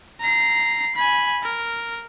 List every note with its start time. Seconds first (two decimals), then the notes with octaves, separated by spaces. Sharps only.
0.21 A#5 C7
0.96 G#5 B5
1.43 A#4